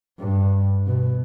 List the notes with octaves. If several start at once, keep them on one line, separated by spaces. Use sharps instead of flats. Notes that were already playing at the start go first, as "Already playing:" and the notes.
G2
B2